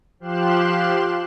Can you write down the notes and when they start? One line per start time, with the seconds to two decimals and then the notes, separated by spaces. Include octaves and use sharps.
0.20 F3 G4 F5 C6 F#6 E7